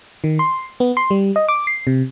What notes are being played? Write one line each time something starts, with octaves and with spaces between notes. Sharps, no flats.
D#3
C6
B3
C6
G3
D#5
D6
C7
C3